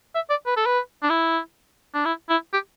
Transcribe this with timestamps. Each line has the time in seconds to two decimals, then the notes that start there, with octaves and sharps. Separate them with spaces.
0.15 E5
0.30 D5
0.46 B4
0.57 A4
0.66 B4
1.03 D4
1.10 E4
1.94 D4
2.05 E4
2.29 E4
2.53 G4